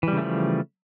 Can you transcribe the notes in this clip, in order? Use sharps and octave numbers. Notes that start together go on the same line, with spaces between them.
C#3 E3 F3 G3 A3